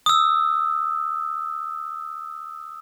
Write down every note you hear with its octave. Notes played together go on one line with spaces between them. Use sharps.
D#6 E6